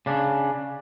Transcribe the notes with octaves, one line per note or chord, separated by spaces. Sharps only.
C#3 D4